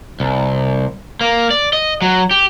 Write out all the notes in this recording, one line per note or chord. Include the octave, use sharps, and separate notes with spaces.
C2
A#3
D5
D#5
F#3
G4